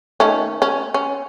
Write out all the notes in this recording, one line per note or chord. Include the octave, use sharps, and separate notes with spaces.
D#3 A3 C#4
C#4
C#4